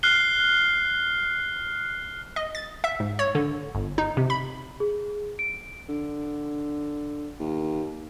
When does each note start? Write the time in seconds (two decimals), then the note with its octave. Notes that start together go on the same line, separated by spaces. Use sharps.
0.03 F6 F#6 C7 G7
2.36 D#5
2.55 A6
2.84 E5
3.00 G#2
3.19 C#5
3.35 D3
3.75 G1
3.98 D#4
4.17 C3
4.30 B5
4.80 G#4
5.39 D7
5.89 D3
7.39 D#2